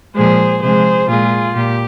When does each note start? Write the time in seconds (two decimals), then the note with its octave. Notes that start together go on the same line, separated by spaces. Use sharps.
0.15 A#2 F3 G#3 G#4 C5
0.62 C3 F3 G#3 G#4 C5
1.09 A#2 G#3 F4 G#4
1.55 A#2 G4